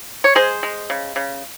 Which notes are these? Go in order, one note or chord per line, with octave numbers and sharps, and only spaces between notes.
C#5
G#3 G#4 C5
G#3
C#3
C#3